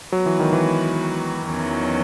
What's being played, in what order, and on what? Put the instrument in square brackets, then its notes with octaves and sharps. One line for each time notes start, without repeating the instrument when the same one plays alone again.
[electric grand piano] F#3 [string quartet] G#3 B3 F#4 B4
[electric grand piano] E3
D#3
E3
[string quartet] E2 D#3 F#3 C#4